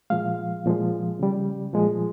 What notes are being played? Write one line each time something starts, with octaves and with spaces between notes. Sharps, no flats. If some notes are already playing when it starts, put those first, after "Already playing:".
A#2 F3 G#3 F5
A#2 F3 G#3
C#3 G3
A#2 F3 G#3